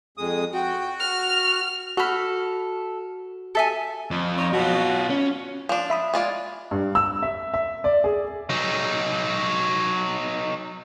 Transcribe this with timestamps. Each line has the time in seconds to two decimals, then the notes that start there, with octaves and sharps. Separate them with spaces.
0.18 F2 G#3 D#6
0.53 F#4 G5
1.00 F6
1.97 F#4 A4 B5 F6
3.55 A4 E5 G#5
4.11 F2
4.39 D#4 C#5
4.53 B2 F#3 F4 F#4
5.10 C#4
5.69 F3 D4
5.90 E5 B5 D#6
6.14 G#3 F4 D5
6.71 G2
6.95 E6
7.22 E5
7.54 E5
7.84 D5
8.04 G#4
8.50 F#3 D#4